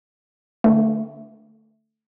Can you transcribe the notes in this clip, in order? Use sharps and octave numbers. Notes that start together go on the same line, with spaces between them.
D3 A3